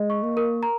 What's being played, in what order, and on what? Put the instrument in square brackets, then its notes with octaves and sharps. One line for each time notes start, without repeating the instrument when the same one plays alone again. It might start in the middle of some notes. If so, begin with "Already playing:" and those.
Already playing: [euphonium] G#3 [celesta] D#5
[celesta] C#6
[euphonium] A#3
[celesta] A#4
A#5